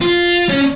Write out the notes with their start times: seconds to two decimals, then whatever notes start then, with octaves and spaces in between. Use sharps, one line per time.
0.01 F4
0.49 C#4